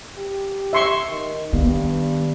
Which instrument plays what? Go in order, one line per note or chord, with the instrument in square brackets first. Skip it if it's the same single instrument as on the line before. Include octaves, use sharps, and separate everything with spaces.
[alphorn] G4
[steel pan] E5 C6 C#6
[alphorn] D#3
[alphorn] G2 [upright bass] D#3 B3